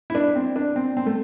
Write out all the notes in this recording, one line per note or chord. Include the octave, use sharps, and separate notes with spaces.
E4
D4
C4
D4
C4
C4
A3